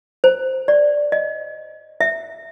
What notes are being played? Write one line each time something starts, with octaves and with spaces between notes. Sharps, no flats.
C5
D5
D#5
E5